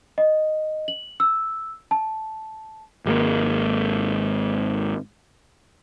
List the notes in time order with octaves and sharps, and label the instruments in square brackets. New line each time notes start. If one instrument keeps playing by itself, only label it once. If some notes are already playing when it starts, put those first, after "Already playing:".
[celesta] D#5
F#7
E6
A5
[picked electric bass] G#1 G#3 A#3